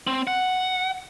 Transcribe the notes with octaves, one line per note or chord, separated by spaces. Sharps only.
C4
F#5